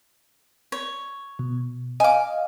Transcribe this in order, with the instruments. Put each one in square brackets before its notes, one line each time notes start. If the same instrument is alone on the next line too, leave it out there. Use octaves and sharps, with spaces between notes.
[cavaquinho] C#5
[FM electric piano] B2
[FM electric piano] D#5 F5 [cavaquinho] G#5 D6